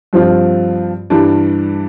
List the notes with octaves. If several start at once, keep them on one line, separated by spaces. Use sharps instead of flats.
G2 F3 C4 F4
G2 E3 G3 D4